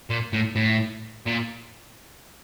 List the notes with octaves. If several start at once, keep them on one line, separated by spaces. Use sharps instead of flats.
A#2
A2
A2
A#2